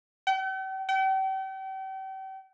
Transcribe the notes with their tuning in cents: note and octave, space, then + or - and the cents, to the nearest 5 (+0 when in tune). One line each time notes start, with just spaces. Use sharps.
G5 -45
G5 -40